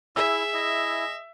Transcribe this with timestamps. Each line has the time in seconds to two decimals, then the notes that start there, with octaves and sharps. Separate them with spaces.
0.16 E4 G#4 E5 E6
0.54 E4 D#5